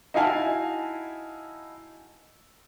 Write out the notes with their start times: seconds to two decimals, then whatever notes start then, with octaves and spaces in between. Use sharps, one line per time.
0.14 D#4 E4 F#4 F5 G#5 A5